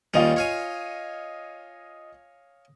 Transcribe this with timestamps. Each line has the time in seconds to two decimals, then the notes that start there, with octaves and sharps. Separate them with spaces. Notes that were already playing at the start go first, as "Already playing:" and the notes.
0.14 D#2 G3 C#4 F4 D#5 F7
0.36 C#5 F5 G#5